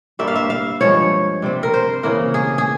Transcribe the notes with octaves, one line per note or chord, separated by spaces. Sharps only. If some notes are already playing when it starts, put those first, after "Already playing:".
G2 G3 A#3 E5
F5
E5
F5
G2 F3 G#3 C#5
C3 G3 C4
A#4
C5
C#3 E3 A#3 A#4
G#4
G#4